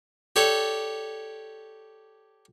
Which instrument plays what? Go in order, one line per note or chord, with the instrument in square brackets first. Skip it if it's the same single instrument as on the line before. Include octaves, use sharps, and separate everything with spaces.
[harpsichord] G4 A4 C#5 D5